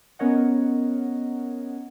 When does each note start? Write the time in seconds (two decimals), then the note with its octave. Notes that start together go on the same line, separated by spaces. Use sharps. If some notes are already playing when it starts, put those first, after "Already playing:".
0.19 B3 C#4 A#4 C#5 D#5 F#5